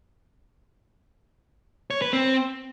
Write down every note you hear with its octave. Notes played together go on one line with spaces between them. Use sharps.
C#5
B4
C4